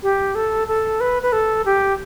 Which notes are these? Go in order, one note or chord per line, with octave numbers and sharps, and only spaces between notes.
G4
A4
A4
B4
B4
A4
G4